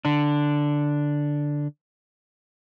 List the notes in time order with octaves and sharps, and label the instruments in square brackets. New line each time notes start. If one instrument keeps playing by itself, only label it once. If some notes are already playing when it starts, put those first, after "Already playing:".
[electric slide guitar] D3 D4